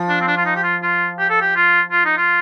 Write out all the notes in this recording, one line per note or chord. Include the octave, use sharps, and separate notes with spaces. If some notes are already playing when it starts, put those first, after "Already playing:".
Already playing: F3
D4
C4
D4
F4
D#4
G4
F4
F4
G4
A4
G4
F4
F4
D#4
F4